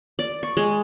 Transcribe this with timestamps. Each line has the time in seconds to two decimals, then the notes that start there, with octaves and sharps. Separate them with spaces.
0.19 D5
0.43 C#6
0.57 G#3